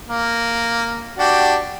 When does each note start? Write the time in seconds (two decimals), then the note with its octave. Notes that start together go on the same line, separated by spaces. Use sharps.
0.09 A#3
1.18 D4 F#4 G4